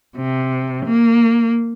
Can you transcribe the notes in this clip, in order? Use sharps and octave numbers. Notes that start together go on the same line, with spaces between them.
C3
A#3